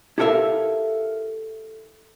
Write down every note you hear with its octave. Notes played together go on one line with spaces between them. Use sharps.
E4 G4 A4 A#4 E5 F5